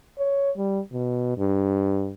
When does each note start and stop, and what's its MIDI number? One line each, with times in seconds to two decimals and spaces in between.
0.19 0.51 73
0.57 0.80 55
0.93 1.35 47
1.38 2.13 43